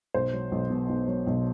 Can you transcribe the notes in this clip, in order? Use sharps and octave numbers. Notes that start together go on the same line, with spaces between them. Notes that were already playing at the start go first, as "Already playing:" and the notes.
B1 C5
F#3
B1
B2
B1
F#3
B1